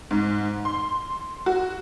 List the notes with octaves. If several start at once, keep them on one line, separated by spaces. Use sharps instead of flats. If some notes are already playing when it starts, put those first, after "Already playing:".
G#2
C6
F#4